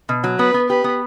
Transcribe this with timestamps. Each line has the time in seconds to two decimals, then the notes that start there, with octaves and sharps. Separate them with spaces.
0.09 B2
0.24 F#3
0.39 B3 B4
0.54 B3
0.69 G4 B4
0.84 B3